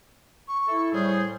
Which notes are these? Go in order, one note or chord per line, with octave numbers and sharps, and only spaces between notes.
C#6
E4 A4
A2 G3 G#4 C5